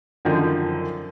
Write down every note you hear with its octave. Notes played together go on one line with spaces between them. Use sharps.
F#2 D3 D#3 F3